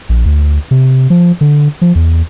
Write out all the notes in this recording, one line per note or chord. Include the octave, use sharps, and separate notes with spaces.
A#1
D2
C3
F3
D3
F3
E2